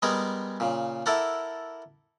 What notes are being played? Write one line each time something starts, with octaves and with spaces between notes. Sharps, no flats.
G3 G#3 B3 G#4 A#4
A#2 C#3
E4 A4 A#4 D5 F#5